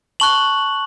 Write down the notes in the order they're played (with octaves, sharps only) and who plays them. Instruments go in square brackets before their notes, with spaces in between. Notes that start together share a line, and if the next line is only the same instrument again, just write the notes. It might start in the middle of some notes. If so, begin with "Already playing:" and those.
[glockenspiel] A5 C#6 F#6 F#7